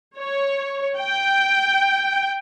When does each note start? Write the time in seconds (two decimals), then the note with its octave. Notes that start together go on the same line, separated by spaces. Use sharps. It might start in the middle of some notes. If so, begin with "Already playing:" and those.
0.17 C#5
0.97 G5